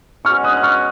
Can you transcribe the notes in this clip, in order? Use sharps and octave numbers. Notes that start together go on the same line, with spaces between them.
B2 G#3 C#4 F#4 C#6 F6
D#6 F#6
F#6
C#6 F6